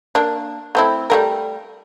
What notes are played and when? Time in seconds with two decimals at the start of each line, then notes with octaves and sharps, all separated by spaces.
0.15 A#3 D4
0.75 A3 C4 E4
1.10 G3 A3 A#4